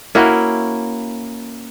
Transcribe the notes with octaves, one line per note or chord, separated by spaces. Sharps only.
A#3 C#4 E4 F#4